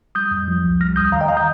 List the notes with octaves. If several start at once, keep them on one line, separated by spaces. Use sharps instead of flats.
G3 D#6 G6
F2
F3
C2
G3 F6 A#6
D#2 D#6 G6
D#3 F5 A#5
D#5 G5
F5 A#5
D#6 G6